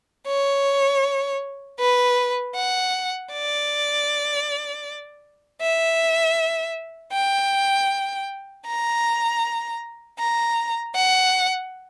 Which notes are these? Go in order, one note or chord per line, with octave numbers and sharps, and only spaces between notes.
C#5
B4
F#5
D5
E5
G5
A#5
A#5
F#5